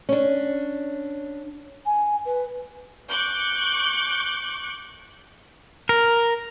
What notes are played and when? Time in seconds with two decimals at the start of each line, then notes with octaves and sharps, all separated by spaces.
0.09 C#4 D4
1.86 G#5
2.25 B4
3.10 C#6 D6 F#6 G6
5.89 A#4